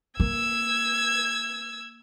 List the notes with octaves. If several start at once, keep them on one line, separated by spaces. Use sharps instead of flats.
A#3 E6 G#6